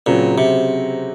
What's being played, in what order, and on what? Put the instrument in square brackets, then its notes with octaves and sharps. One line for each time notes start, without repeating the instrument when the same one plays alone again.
[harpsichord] A#2 [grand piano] C#3 F#3 C4
[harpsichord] C3